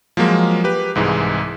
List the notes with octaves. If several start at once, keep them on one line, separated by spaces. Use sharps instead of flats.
F3 F#3 G#3 A#3
G4 B4
C2 G#2 E3 G#3